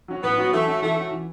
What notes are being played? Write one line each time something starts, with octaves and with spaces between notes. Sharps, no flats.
F#3 C#4 F#4
A2 B3
F#3 C#4 F#4
E3 A3
C#4 F#4
E3 A3
C#4 F#4
E3